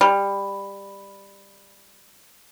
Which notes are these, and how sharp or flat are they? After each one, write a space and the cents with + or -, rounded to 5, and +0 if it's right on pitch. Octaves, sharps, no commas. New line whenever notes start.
G3 +15